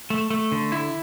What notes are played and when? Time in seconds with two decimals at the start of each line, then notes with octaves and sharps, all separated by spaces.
0.10 A3
0.30 A3
0.52 D3
0.72 E4